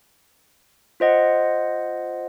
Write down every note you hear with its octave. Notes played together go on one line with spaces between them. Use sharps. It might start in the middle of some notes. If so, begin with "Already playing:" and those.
F4 C5 D#5 F#5